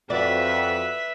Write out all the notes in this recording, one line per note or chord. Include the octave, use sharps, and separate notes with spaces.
F2 F#4 B4 D5 E5